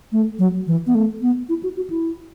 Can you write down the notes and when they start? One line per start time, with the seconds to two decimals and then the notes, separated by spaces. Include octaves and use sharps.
0.12 A3
0.39 F#3
0.67 E3
0.87 B3
0.95 A3
1.22 B3
1.49 E4
1.63 F#4
1.76 F#4
1.90 E4